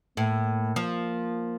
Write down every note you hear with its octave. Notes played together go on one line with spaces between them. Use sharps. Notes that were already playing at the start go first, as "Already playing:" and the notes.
A2 A#3
F3